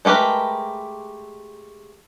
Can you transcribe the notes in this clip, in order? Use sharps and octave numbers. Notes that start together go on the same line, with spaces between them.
G#3 A3 G4 A#4 B4